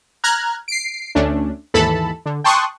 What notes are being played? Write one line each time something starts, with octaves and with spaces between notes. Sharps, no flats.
A#5 F6 F#6 G#6
C7 D7
D2 A3 C#4 D4
D#2 G#2 E3 A4 A5 B5
D3
G5 A5 C6 C#6 D#6 F#6